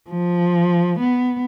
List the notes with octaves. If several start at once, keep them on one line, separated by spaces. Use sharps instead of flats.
F3
B3